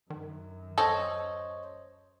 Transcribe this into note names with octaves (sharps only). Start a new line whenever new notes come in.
F#2 D#3
D1 A4 C5 C#5 D#5